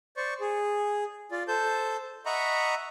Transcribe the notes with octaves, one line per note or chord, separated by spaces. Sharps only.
C5 D5 C#6
G#4
F4 D5
A4 C5 A5 G6
D#5 E5 F#5 A#5 B5 C#6